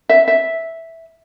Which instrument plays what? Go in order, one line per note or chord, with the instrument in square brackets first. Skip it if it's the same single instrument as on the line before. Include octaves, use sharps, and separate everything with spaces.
[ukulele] E5
E5